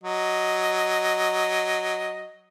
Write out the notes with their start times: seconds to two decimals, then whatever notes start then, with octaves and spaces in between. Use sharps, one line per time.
0.03 F#3 D#5